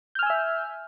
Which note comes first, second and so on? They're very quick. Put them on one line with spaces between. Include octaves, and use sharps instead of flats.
G6 F6 G#5 E6 E5